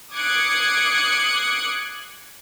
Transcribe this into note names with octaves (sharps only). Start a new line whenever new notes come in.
D6 D#6 F#6 G#6 C7 C#7